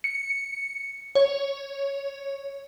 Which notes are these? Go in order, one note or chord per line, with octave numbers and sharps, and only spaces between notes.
C#7
C#5